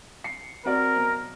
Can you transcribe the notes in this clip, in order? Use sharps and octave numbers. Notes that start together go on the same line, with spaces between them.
C7 C#7
C4 F#4 A#4 D5
B1